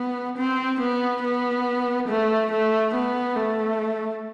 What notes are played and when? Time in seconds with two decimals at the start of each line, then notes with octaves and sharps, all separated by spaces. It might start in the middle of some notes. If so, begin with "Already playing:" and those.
Already playing: B3
0.37 C4
0.80 B3
1.23 B3
2.08 A3
2.51 A3
2.94 B3
3.35 A3